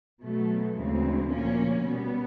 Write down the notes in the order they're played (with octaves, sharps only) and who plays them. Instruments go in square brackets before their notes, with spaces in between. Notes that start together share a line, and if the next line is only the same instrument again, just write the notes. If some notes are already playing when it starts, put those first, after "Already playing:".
[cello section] B2 F#3 A3
D2 C#3 E3 G#3 C4
A#2 F3 A#3 C#4
B2 G3 B3